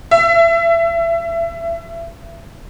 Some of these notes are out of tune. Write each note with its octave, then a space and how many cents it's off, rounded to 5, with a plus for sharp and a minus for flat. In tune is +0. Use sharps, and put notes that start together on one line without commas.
E5 +30